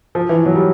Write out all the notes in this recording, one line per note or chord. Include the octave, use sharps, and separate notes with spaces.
F3
E3
F#3
G3